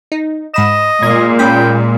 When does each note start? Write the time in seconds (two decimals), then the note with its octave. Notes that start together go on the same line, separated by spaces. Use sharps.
0.12 D#4
0.54 G#2 D#5 B5 E7
1.03 A#2 G#3 G#6
1.39 C#4 G5 B5